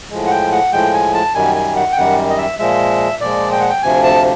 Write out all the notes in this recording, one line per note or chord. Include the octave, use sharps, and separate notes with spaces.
A2 F3 G#3
F#5
G5
F#5
A2 F3 G#3 G5
G#5
A5
F#2 D#3 G3 G#5
G#5
F#5
G5
F#2 D#3 G3 F#5
D#5
E5
A#2 F3 G#3 E5
A#2 F3 G#3 D5
G5
F#5
G5
D2 C3 F3 G#5
A5